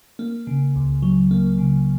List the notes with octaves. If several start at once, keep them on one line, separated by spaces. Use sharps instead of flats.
A#3
C#3
C#2
F#3
A#3
C#3